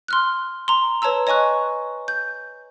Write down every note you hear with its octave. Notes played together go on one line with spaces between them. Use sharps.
C6 F6 F#6
A#5 C6
B4 C#5 A5 A#5 E6
C#5 D#5 G#5 C#6 F#6
G6